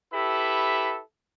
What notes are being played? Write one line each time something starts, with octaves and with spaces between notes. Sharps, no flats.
E4 G4 A4 B4 E5 B5